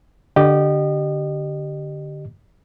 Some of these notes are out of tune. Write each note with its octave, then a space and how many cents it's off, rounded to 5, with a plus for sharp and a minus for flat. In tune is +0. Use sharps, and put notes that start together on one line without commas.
D3 +0 G4 -10 D#5 -30